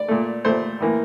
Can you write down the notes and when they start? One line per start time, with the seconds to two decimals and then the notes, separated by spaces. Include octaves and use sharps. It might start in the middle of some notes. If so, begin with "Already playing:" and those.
Already playing: D5
0.08 A#2 A3
0.45 A#2 A3 C5
0.80 A2 E3 A#3